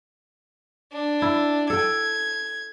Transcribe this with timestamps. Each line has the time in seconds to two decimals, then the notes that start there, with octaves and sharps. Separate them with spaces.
0.93 D4
1.22 E4
1.70 A4 G5 G#6